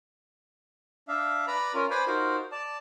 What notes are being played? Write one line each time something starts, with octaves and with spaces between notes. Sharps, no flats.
D4 E5 F5
B4 D5 A#5 B5
C#4 F4 A#4
B4 C5 D5 G#5 B5
D#4 F4 F#4 A#4 C5
D5 A5